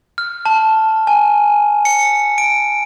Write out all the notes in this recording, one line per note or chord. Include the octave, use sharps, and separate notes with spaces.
F6
A5
G#5
C#7
D7